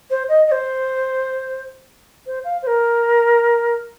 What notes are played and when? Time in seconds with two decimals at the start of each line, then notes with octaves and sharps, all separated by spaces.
0.10 C5
0.29 D#5
0.47 D#5
0.51 C5
2.26 C5
2.44 F5
2.62 C5
2.67 A#4